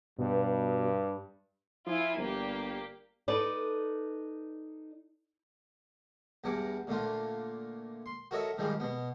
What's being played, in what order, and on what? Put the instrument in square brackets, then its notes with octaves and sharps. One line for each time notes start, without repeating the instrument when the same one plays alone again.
[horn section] G2 [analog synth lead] B2
[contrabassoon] F3 [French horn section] E4 [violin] F4 G#5
[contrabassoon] G1 [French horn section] G3 [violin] A#3 G4
[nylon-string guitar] D#4 A4 B4 D5
[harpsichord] E2 G2 E3 F#5 D6
A#2 D3 A3 F4
C6
F#4 A4 A#4 C#5 D#5 E5
G#2 D#3 F3 G3 G#3
B2 B3